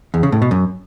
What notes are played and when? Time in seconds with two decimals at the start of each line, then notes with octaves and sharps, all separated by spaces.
0.14 E2
0.23 C#3
0.32 A2
0.42 B2
0.51 F#2